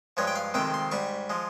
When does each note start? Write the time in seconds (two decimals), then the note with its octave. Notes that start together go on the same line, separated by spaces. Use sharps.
0.17 G2 F3 G#3 C#5
0.27 G5
0.35 F5
0.54 F2 C3 D#3 G#3 G5
0.74 C6
0.91 G#2 G3 C#6
1.30 F3 G#3